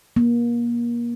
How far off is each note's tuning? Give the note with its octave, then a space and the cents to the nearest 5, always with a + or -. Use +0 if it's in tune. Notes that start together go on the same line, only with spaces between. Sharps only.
A#3 +30